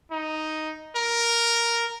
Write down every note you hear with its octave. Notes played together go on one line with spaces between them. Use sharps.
D#4
A#4